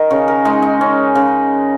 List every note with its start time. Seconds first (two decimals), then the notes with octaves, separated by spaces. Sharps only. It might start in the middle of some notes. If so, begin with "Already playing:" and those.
Already playing: D#3 D#4 A#4 D#5 A#5
0.10 C#3 C#5
0.28 A#4
0.45 G#3 D#4
0.62 D#4
0.81 C#4
1.15 C#3